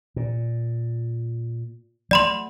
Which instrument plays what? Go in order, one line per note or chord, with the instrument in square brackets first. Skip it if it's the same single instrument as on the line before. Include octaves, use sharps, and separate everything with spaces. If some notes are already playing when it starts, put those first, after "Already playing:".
[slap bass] A#2
[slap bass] F#3 A3 [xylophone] D5 B5 C6